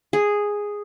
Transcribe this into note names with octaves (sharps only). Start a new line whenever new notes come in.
G#4